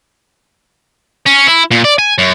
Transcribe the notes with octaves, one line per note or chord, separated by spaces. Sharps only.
C#4
E4
A#2
D5
G#5
F#2